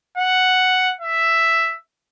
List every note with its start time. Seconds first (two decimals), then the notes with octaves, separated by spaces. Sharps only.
0.18 F#5
1.01 E5